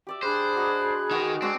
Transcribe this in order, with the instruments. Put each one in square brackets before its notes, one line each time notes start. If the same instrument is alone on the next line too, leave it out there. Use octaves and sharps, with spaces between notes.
[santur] G4 D5 E5
[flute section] D4 B5 F#6 [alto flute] G#4 [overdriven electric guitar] C5
[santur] F#4 D#5 A#5
[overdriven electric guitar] D#3 [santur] G#3 F#4 B4
[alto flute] G#3 [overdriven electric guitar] C4 [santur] D4 F#4